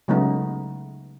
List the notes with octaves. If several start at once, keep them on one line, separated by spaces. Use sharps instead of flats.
C#3 F#3 G#3 A3 B3 D#4